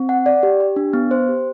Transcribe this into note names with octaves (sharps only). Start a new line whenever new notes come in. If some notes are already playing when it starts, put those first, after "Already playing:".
Already playing: C4
F#5
D5
G4
G4
D4
B3
C5
G4